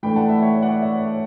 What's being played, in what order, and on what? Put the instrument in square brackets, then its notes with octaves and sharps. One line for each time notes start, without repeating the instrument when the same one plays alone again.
[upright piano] A2 E3 A3 D4 G5 B5
F#5 A5
E5 G5
C#5 E5
D5 F#5
C#5 E5
C#5